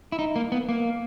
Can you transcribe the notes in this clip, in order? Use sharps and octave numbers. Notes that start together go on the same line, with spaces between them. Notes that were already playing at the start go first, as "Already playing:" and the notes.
E4
D#4
A#3
B3
A#3